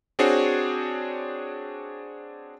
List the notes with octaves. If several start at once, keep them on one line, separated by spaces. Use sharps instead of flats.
C4 D4 F#4 G#4 C5 C#5